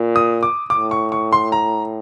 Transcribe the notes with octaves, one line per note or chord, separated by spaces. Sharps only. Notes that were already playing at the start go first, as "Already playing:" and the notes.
Already playing: A#2
D#6
D6
A2 D6
C#6
C#6
C6
A#5